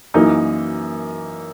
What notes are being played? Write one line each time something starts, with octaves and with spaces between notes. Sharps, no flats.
F#2 E3 A#3 D#4